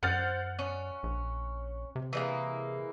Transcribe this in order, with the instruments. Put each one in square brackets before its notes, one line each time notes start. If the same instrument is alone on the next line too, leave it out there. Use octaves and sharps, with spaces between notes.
[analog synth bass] F#2 [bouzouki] C5 [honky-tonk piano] F#5 F6 A6
[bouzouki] C#4
[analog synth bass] A#1
C3
[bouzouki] E3 G#3 A#3